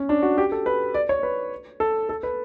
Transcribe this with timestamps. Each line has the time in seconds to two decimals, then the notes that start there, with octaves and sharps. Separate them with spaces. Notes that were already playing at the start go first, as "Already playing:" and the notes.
Already playing: C#4
0.09 D4
0.23 F#4
0.38 G4
0.52 A4
0.66 B4
0.94 D5
1.09 C#5
1.23 B4
1.80 A4
2.09 A4
2.23 B4